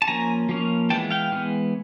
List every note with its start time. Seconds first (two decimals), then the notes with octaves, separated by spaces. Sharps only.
0.02 A5
0.08 F3 A#3 C#4 G#5 A#5
0.49 F3 A#3 C#4
0.90 E3 G#3 B3 G5 A5
1.11 F5 G5
1.32 E3 G#3 B3